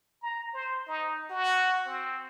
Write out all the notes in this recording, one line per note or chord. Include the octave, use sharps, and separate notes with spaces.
A#5
C5
D#4
F#4
C4